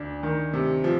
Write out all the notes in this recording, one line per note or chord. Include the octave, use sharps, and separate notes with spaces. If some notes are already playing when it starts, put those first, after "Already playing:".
Already playing: D2 D4
D#3
C3
F3